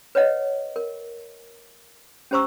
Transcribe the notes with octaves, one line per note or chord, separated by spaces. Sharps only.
B4 C#5 D#5 F#5
A#4
C#4 G4 C5 A#5 C#6 E6